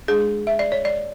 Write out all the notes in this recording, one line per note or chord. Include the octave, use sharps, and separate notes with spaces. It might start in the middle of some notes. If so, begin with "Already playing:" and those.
G#3 D4 G#4
E5
D5
C#5
D5